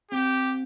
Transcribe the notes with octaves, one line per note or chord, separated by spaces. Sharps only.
C4 G4